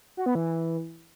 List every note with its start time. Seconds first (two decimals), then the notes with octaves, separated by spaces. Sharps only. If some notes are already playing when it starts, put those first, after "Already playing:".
0.17 F#4
0.26 B3
0.35 E3